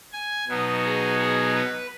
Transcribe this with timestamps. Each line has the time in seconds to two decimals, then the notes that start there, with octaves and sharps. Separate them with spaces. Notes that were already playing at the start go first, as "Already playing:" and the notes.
0.13 G#5
0.48 B2 F#3 B3 D#4
0.84 G#4
1.20 G#4
1.55 B4